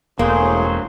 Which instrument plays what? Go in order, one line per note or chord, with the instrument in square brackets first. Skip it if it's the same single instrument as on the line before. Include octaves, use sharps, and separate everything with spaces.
[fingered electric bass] E1 [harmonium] A2 G#4 [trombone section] F#3 C5 [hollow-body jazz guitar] A#3